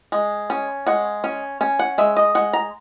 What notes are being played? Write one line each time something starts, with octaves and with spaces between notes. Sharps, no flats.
G#3
C#4
G#3 F#5
C#4
C#4 G#5
F#5
G#3 E5
D#5
G#3 F#5
A#5